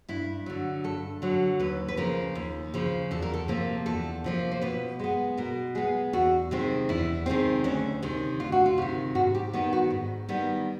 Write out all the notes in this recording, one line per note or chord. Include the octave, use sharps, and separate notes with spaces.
G2 E4
D3 F#3
G2 A4
D3 F#3
D#2 B4
B4
C#3 F3 A#4
D#2
C#3 F3
E2 A4
A#4
A4
C3 F3 A#3
E2 A4
C3 F3 A#3
C5
B2 B4
G#3 B3
B2 A#4
G#3 B3 G#4
E2 F#4
C3 D#3 G#3 C4
E2 E4
C3 D#3 G#3 C4
D2 C#4
C3 D#3
D2 F4
F#4
F4
C3 D#3
G#2 F#4
G4
D#3 G3 B3
F#4
G#2
D#3 G3 B3